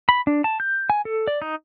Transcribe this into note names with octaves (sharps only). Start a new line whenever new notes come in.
B5
D4
A5
G6
G#5
A4
D5
D#4